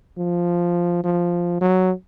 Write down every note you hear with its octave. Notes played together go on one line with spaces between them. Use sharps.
F3
F3
F#3